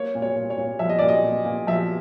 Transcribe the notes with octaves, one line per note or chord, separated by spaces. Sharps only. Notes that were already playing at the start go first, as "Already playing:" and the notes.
Already playing: A#3 C#5
A#2
C#5
A#2
C#5
A#2
F3 E5
D#5
A#2 D5
D#5
A#2
A#2
F3 E5